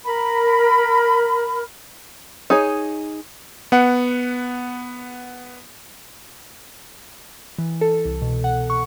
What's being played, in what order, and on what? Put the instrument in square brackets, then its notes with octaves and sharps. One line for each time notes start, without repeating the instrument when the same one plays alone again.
[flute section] A#4 B5
[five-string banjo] D#4 G#4 C#5
[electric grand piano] B3 F#5
[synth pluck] E3
A4
C2
B2
F#5
C#6